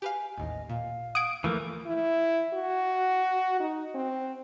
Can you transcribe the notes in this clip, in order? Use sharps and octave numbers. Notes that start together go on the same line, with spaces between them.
G4 B4 F5 G#5
A1 D#2 D#5
A#2 F5
F#5 D#6 G#6 D7
E3 F3 A3 A#3 A#4
E4
F#4
D#4
C4